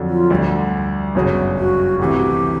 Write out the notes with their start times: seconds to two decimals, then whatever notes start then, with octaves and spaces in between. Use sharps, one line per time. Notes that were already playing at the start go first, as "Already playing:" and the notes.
Already playing: F2 D3 F#3
0.09 F4
0.30 D2 D3 G3
1.15 G1 F#2 C#3 F#3
1.57 F#4
1.99 D2 C3 E3 G4